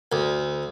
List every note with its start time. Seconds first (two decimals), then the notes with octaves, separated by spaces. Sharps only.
0.12 D2